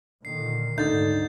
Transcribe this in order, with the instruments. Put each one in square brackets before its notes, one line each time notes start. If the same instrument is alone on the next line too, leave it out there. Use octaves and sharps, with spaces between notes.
[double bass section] A#2 D3 D#3 [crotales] C7
[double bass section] D2 G#2 [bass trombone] D3 [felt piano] D#4 [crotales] G6 A6